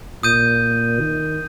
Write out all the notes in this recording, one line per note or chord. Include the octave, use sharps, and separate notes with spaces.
A#2 D#6 G6 D#7
D#3